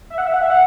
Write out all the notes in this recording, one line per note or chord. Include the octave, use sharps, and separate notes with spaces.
E5
F#5
E5
F#5
E5
F#5